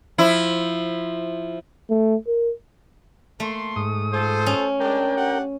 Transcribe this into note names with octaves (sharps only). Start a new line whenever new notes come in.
F3 E4
A3
A#4
A3 A#3 A4 C6
G#2 D#6
F4 A4 C5
C#4
G#3 D4 A#4 G5
D4 G4 F#5